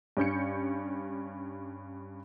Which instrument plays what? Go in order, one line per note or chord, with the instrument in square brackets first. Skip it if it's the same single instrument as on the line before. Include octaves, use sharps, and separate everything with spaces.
[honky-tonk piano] G2 C#4 G6 C#7